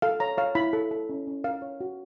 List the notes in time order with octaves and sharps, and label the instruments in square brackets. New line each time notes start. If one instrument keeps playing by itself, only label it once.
[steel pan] A4 F5
C#5 A#5
C#5 F5
E4 B5
A4
A4
C#4
C#4
A#4 F5
C#5
F#4